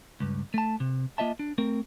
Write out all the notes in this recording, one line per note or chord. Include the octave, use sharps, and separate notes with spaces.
C#2 G2
A3 A5
C3
A#3 F4 D#5 E5 A5
D4
A3 C4 A#4